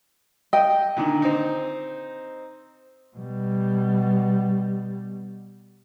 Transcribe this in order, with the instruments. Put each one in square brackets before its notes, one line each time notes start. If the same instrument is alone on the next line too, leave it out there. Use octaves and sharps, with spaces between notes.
[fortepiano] D#5 [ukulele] G5
[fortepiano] A#2 D3 D#3
C4 D#4
[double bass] B2 G3